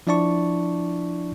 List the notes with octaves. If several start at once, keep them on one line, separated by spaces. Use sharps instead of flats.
F3 D4 E4 D5 A5 C#6